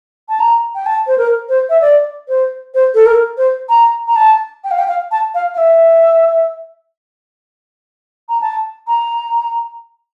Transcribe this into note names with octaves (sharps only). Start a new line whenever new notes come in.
A5
A#5
G5
A5
C5
A#4
C5
E5
D5
C5
C5
A4
A#4
C5
A#5
A#5
A5
G5
F5
G5
F5
A5
F5
F5
E5
A#5
A5
A#5